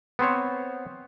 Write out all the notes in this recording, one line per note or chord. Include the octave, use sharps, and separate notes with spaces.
B3 C4 C5 C#5